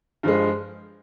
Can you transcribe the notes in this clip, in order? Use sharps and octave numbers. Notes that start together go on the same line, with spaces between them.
G2 F3 G#3